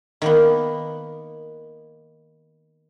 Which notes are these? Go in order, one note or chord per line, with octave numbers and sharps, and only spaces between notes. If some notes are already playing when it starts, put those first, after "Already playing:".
D#3 A#3 B3